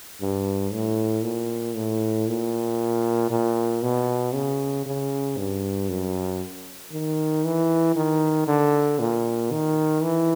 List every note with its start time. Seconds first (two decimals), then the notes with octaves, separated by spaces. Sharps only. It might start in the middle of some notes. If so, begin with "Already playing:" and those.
0.21 G2
0.72 A2
1.24 A#2
1.76 A2
2.28 A#2
3.31 A#2
3.82 B2
4.34 C#3
4.86 C#3
5.38 G2
5.89 F#2
6.92 D#3
7.44 E3
7.96 D#3
8.47 D3
8.99 A#2
9.51 D#3
10.03 E3